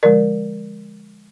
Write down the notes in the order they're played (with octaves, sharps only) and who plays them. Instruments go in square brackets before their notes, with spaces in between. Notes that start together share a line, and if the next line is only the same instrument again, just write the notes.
[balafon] D3 F3 G#3 A#4 D5